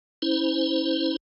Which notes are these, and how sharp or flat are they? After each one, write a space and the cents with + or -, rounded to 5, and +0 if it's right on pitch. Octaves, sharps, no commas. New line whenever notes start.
C#4 +0 E4 -25 C5 -10